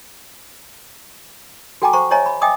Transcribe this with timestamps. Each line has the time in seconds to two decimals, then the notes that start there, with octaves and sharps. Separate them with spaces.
1.82 F#4 A4 G5 G#5 A#5 D6
1.93 C5 F#5 A#5 C#6
2.11 C5 C#5 D#5 E5 G#5 A#5
2.26 B5
2.42 D#5 E5 G5 G#5 D6 D#6